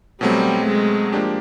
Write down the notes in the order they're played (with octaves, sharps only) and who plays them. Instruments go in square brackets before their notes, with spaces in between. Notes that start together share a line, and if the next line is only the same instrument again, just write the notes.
[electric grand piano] B2 F#3 A3 C4 [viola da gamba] G3
[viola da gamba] G#3
[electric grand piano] F3 A#3 D4 G4